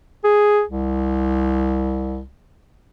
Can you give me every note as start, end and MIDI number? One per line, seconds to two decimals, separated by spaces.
0.24 0.62 68
0.69 2.25 36